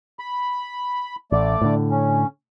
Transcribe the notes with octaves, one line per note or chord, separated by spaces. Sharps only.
B5
A1 A3 D5
A2 D3
C#4